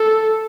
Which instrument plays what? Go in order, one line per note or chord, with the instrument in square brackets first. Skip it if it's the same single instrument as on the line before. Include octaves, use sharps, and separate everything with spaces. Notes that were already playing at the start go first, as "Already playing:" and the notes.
Already playing: [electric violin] A4